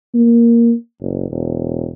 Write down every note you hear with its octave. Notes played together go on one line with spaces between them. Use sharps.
A#3
F#1
E1